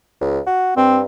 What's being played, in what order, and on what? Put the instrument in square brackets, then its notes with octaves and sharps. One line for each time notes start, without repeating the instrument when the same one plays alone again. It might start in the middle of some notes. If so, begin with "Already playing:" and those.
[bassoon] C#2
F#4
[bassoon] G2 [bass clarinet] C4